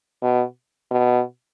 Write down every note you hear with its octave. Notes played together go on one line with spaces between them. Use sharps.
B2
B2